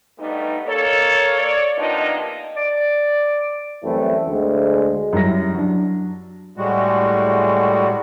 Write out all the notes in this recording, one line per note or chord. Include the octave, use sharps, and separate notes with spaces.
G2 G3 A3 B3 D#4
A#3 A4 C#5
C#5 D5
C3 F3 A#3 B3 D4 D#4
D5
F#2 E3 G3 A3 C4 E4
D2 G#3
F#2 G3 E4 A#6
F#3 D4
A2 G3 G#3 F#4